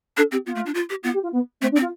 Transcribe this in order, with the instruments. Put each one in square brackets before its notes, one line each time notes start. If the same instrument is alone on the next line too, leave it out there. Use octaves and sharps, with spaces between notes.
[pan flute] D4 [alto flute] A4
[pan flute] C4 [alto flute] G4
[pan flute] B3 [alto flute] F4
[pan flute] A3
D4
F4
G4
[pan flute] B3 [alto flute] F4
[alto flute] G4
F4
B3
[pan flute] A3 [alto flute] C4
[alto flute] D4
[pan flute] C4
[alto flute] F4